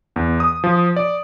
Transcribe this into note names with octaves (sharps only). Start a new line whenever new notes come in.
E2
D#6
F3
D5